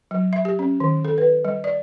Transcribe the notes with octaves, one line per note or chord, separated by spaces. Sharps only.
F#3
E5
G4
C#4
D#3
A4
B4
G3
D5